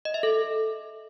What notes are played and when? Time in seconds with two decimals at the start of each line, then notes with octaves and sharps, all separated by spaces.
0.05 D#5
0.14 E5
0.23 A4